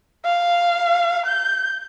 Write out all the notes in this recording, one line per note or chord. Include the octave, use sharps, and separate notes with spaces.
F5
G6